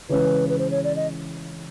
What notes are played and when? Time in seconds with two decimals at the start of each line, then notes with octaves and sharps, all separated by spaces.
0.09 C#3 E3 G#3 C#4 E4 B4
0.49 B4
0.59 C5
0.71 C#5
0.84 D5
0.96 D#5